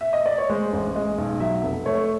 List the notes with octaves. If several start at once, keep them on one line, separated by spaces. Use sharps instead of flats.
E5
D#5
D5
C#5
G#3 C5
A1
G#3 D#5
B1
F#3 E5
F1
A3 C#5